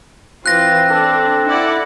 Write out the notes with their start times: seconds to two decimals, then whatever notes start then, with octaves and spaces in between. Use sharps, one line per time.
0.46 E3 C4 F4 F#6 A#6
0.90 D4 A4
1.48 E4 D5 F#5